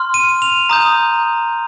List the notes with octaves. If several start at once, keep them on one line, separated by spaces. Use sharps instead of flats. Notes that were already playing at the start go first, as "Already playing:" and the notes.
Already playing: C6 F6
D#7
F7
A#5 D#6 G6